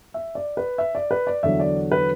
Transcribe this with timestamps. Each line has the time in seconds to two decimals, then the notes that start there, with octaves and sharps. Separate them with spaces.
0.14 E5
0.35 D5
0.57 B4
0.78 E5
0.95 D5
1.11 B4
1.27 D5
1.43 E2 D3 F#3 E5
1.60 D5
1.92 B4